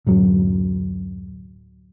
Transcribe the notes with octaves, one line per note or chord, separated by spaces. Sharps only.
D1 F#2 F#3